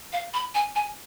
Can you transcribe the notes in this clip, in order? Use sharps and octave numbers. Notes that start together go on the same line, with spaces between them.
F5
B5
G#5
G#5